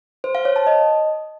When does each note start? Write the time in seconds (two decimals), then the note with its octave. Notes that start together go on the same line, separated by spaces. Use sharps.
0.24 C5
0.35 F5
0.45 C#5
0.56 A5
0.67 D#5